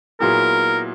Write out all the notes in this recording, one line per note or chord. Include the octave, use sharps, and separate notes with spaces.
A#2 F#3 B3 E4 G#4 A#4